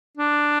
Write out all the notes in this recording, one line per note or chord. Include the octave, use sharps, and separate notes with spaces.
D4